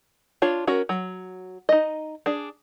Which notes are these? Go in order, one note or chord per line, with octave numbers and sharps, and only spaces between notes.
D4 F4 C#5
C#4 F#4 A#4
F#3
D#4 D#5
D4 G#4